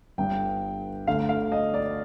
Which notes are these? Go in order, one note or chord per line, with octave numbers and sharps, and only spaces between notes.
G1 G2 D3 G5
D2 D3 A3 F5
F5
D#5
D5